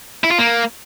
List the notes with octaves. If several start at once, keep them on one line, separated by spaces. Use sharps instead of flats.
E4
F4
A#3